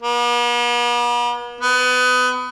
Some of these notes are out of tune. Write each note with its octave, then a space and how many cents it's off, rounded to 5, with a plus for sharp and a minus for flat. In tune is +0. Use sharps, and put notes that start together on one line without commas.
B3 -45
B3 +25